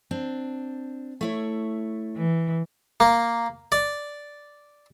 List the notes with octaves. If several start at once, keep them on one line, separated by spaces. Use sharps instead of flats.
C4 D4
A3 E4 C#5
E3
A#3
D5